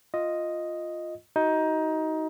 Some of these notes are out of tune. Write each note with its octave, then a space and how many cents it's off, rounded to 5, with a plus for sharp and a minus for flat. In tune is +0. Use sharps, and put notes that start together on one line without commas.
F4 +0 D#5 +0
D#4 +20 F#4 +20